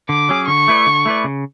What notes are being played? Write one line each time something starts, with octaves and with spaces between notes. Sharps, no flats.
D3 D6
F#3 C#4 G#4
D3 C#6
A3 E4 B4 D5
D3
A3 E4 B4 D5
C#3